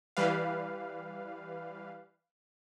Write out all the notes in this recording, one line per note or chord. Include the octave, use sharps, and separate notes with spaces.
E3 G3 B4 F5